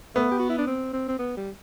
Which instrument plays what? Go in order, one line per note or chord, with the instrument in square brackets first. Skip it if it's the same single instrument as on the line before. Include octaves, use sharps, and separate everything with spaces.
[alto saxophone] A3 [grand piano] B3
[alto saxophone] G4
F#4
E4
D4
C4
C4
C4
B3
G3